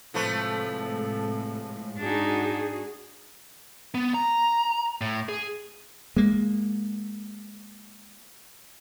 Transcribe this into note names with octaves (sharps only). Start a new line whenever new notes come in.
A2 C3 F3 G#3 A3 A4 B4
G#2 D4 D#4 F#4 G#4
B3
A#5
A2
G#4
G#3 A#3